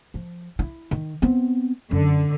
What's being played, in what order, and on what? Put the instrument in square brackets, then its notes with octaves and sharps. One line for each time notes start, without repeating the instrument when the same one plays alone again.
[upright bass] F3
E4
D#3
B3 C4
[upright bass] F#2 [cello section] D3